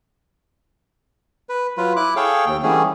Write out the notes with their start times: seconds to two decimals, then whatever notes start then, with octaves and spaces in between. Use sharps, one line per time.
1.49 B4
1.77 F#3 F4 B4
1.96 E4 D6 F#6
2.16 G#4 A4 C#5 F5 G5
2.46 D#2 G5
2.63 D3 E3 G3 A3 C#4 G#4